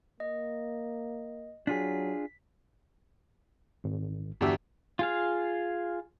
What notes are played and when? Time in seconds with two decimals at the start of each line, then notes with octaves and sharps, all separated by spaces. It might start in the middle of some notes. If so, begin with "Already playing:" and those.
0.20 A#3 D#5
1.67 F#3 D4 F4 G#4 B6
3.84 G#1
4.41 G1 E2 D4 F#4 G4 E5
4.99 F4 G#4 F5